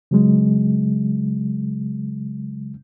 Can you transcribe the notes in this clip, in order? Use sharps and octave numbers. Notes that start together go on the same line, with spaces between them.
C#3 F#3 G#3